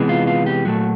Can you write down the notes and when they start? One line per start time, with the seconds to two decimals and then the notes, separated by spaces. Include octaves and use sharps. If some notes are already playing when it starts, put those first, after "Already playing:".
Already playing: C3 E3 G#3 B3
0.09 F4
0.27 F4
0.46 G4
0.65 A#2 F#3 A3 F#4